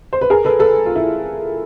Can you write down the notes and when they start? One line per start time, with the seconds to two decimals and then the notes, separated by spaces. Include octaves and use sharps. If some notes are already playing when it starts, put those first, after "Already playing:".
0.13 C5
0.21 B4
0.30 G#4 A#4
0.45 A4 B4
0.59 A4 B4
0.86 F4
0.95 E4